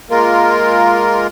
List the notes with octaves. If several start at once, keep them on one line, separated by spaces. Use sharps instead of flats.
G#3 A#3 F4 A#4